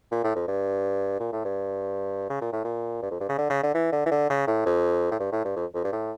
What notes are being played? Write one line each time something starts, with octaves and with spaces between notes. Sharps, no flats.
A#2
A2
F2
G2
A#2
A2
G2
C#3
A#2
A2
A#2
G2
F2
G2
C#3
D3
C#3
D3
E3
D3
E3
D3
C#3
A2
F2
A2
G2
A2
G2
F2
F2
G2
A2